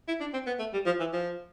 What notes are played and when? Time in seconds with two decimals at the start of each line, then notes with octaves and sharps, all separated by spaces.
0.08 E4
0.20 D4
0.33 C4
0.47 B3
0.59 A3
0.73 G3
0.86 F3
1.00 E3
1.13 F3